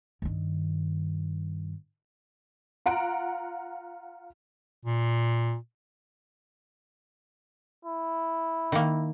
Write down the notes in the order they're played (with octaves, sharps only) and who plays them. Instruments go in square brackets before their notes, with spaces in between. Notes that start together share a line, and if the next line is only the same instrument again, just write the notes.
[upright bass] G2 D#3
[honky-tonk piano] F4 F#5 A#5 D7
[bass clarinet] A#2
[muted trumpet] E4
[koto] D#3 A#3